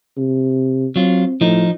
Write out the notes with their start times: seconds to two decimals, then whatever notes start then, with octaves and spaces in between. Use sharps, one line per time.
0.17 C3
0.96 F#3 C4 F4
1.41 A2 F3 D#4